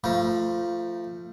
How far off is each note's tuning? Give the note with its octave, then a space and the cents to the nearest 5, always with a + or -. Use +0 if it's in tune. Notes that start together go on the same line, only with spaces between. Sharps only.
F3 -10 A3 +15 A#5 +30